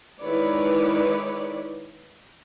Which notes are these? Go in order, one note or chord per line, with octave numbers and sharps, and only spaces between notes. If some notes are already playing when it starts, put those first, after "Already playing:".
D#3 G#3 E4 B4 C#5 D5